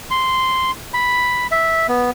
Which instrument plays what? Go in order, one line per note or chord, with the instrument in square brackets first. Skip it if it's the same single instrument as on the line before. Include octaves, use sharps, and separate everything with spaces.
[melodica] C6
B5
E5
B3